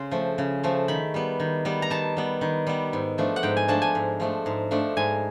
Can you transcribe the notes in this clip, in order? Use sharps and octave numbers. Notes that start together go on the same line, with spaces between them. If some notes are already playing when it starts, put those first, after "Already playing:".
Already playing: C#3 C6
F3 A3
C#3
F3 A3
D#3 B5
G3 B3
D#3
G3 B3
A#5
D#3 A5
G3 B3
D#3
G3 B3
G#2
F3 A3 D4
F#5
G#2 G5
G#5
F3 A3 D4 A5
G#5
G#2
F3 A3 D4
G#2
F3 A3 D4
G#2 G#5